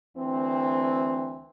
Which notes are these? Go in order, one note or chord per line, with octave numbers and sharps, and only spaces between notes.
D2 E3 C4